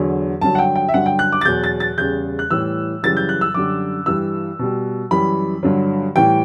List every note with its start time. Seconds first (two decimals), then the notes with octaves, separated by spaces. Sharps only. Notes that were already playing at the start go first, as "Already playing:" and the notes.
Already playing: E2 D3 F#3
0.41 G2 D3 F#3 A5
0.55 F#5
0.59 G5
0.76 G5
0.89 E5
0.94 G2 D3 F#3 F#5
1.06 G5
1.19 F#6
1.32 D6
1.41 A6
1.45 E2 B2 F#3 G6
1.64 A6
1.80 A6
1.98 E2 C#3 G3 G6
2.39 F#6
2.51 A2 E3 G3 E6
3.03 F#2 C#3 E3 G3 A6
3.17 G6
3.29 F#6
3.41 E6
3.54 F#2 D3 G3 D6
4.06 G2 E3 G3 E6
4.59 B2 G3
5.11 F#2 E3 G3 B5
5.63 G2 D3 F#3
6.16 A2 E3 G3 G5